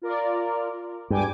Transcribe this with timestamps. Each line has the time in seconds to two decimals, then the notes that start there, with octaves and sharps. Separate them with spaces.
0.02 F4 A#4 D5
1.10 G2 G5 G#5 D6